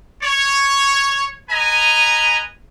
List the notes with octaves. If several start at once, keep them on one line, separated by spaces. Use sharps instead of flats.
C#5
B4 D#5 G#5 A#5